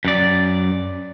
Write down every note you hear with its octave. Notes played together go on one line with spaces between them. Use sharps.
F#2 D5